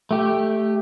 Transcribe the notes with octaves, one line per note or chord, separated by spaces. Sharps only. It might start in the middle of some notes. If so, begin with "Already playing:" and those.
A3 G4